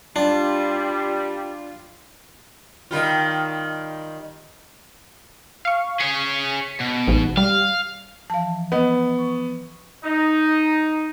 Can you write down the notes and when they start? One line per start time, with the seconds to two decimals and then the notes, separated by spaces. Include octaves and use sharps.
0.16 G3 D4 F4
2.91 D#3 G3 F4
5.65 F5 C#6
6.00 G#4 C#5 B6 C#7
6.80 B2
7.08 A1 G#2
7.37 G3 F5
8.30 E3 F3 F5 A5
8.72 B3 B4 D#5
9.18 C#6
10.05 D#4